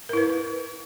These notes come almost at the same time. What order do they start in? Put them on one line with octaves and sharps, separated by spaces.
A#4 E4 B4